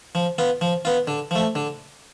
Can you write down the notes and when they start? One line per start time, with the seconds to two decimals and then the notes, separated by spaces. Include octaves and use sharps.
0.15 F3
0.38 B3 F4
0.61 F3
0.85 B3 F4
1.07 D3
1.31 F3 A3
1.55 D3